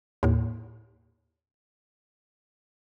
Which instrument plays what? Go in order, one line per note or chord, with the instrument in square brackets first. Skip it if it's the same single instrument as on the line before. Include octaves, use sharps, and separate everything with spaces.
[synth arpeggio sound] D#2 A2